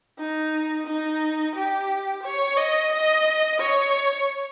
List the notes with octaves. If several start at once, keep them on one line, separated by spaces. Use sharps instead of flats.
D#4
D#4
G4
C#5
D#5
D#5
C#5